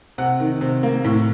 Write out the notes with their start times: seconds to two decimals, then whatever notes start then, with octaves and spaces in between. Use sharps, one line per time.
0.18 C3 F#5
0.40 D#3
0.61 C3
0.83 A#3
1.05 A2